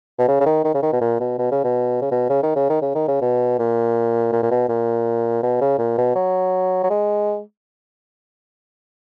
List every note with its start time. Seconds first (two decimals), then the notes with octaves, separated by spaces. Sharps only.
0.19 B2
0.28 C#3
0.40 C#3
0.46 D#3
0.64 D#3
0.74 C#3
0.83 D#3
0.93 B2
1.01 A#2
1.20 B2
1.39 B2
1.52 C#3
1.64 B2
2.02 C#3
2.11 B2
2.30 C#3
2.43 D#3
2.56 C#3
2.70 D#3
2.82 C#3
2.95 D#3
3.08 C#3
3.22 B2
3.59 A#2
4.32 A#2
4.43 A#2
4.51 B2
4.69 A#2
5.43 B2
5.61 C#3
5.79 A#2
5.98 B2
6.15 F#3
6.84 F#3
6.90 G#3